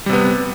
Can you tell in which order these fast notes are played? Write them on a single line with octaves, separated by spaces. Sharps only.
G3 C3 B3